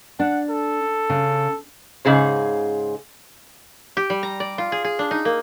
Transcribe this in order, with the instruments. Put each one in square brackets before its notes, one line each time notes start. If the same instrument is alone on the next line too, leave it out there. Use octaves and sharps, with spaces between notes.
[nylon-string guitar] D4 [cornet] F#5
[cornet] A4
[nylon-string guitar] C#3
[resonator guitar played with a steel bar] G#2 C#3 G#4 C5
[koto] G4
G3
A#5
D5
F4
G#4
G#4
D4
D#4
A#3